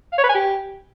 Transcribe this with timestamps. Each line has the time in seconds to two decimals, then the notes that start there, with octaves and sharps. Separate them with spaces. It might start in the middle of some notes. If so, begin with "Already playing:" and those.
0.12 F5
0.18 C#5
0.24 B4
0.29 G#5
0.35 G4